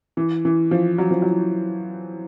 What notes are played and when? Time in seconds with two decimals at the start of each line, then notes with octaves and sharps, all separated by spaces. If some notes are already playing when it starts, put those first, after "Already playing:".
0.17 E3
0.45 E3
0.71 F3
0.98 F#3
1.11 F3
1.22 F#3